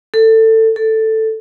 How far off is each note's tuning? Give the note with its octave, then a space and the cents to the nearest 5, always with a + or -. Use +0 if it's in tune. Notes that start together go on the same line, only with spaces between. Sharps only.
A4 +20
A4 +5